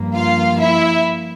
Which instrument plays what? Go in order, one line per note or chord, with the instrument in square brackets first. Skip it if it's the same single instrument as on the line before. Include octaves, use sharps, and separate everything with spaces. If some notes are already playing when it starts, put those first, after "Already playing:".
Already playing: [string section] G2 F3 A#3
F4 F5
E4 E5